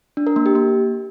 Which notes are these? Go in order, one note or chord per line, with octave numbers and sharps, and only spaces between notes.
D4
A#4
A#3
G4
A#3